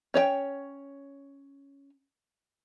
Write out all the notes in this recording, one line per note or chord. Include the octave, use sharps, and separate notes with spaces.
C#4 C#5 D5 G5